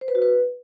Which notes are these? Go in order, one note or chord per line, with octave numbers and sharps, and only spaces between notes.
C5
B4
F#4
B4